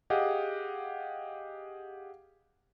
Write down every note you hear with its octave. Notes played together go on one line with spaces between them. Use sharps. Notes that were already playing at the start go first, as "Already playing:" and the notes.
G4 G#4 D#5 F5 F#5